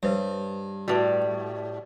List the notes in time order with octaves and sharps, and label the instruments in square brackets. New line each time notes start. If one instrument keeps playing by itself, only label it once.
[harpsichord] G2 [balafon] G4 C5 C#5
[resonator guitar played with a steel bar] A2 G3 [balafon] F#4 B4 A5